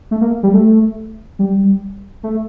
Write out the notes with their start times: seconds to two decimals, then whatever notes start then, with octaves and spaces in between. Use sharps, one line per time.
0.11 A3
0.21 A#3
0.43 G3
0.53 A3
1.39 G3
2.23 A3